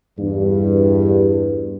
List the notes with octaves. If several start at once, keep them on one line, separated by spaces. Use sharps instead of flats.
E2 G2